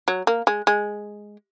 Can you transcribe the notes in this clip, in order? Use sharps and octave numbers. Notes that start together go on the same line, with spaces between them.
F#3
A#3
G#3
G#3